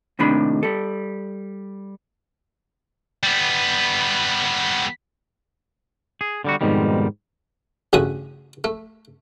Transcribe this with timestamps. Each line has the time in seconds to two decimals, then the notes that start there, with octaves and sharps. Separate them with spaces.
0.19 D#2 A2 C3 D#3 D4 B5
0.63 G3 A4
3.23 G3 B3
6.21 G#4
6.44 D3 G3 F#4
6.61 F2 G#2 B2 D#3 G3
7.93 A1 G2 C#3 A3 F#4 D#6
8.64 A3